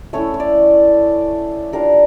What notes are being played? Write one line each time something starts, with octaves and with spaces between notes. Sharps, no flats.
A3 C#4 E4 C#5
C#5
D5
G3 D4 F4 A#4